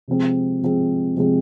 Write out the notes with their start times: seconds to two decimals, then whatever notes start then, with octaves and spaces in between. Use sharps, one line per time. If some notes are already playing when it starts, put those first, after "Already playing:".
0.08 C3 F3 G#3 C4
0.62 C3 F3 G#3 C4
1.16 C3 F3 G#3 C4